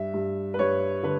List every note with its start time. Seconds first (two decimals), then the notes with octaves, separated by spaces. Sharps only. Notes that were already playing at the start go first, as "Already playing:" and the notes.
Already playing: G2 E5
0.14 G2
0.54 B4
0.59 G2 C#5
1.03 D3 B4